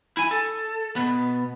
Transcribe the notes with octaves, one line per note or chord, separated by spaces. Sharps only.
E4 G#5
A4
B2 B3